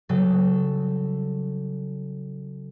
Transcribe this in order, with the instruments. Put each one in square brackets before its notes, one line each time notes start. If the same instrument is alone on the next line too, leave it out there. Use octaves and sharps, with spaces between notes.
[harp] C#3 F#3 G3 A4